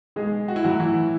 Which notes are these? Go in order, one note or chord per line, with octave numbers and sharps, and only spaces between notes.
B1 G#3 G#4
F#4
E4
A2 E3 F#3 F#4
E3 E4